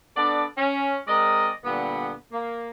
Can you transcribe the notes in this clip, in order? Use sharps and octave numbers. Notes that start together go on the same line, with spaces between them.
B3 D4 A4 D5
C#4
G#3 C4 A#4 D5 D#5
A#2 D3 G3 B3
A#3